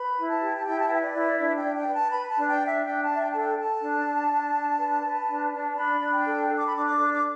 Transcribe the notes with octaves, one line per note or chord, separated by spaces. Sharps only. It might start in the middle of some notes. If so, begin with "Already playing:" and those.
Already playing: B4 B5
E4
A5
G4
A5
E4 G5
A5
G5
B4
E5
D5
E4
D4 E5
G5
D4
G5
B4
A5
B4 B5
A5
D4
G5
D4
E5
D4 G5
A5
D4
E5
G5
A4 A5
G5
A4 A5
D4
D4
D4
D4
B4
B4
D4
D4
D4 B5
D4
G5
A4
A4
D6
B5
D4 D6
D6
D4
D6